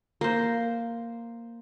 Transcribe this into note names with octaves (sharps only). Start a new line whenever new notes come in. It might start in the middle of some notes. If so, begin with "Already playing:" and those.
A#3 C5